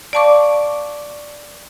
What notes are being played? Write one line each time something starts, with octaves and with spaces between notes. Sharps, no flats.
D5 F5 A5 C#6 D6